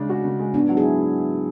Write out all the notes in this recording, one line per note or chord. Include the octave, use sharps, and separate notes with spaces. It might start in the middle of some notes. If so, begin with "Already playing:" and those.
Already playing: C#3 G#3 D4
F#4
C#3
G#3
G#2 B3 D4
F#3
E4 G#4